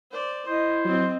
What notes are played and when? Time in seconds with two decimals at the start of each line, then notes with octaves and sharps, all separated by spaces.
0.11 C5 D5
0.48 E4 C5 D#5
0.85 F#3 C4 D#5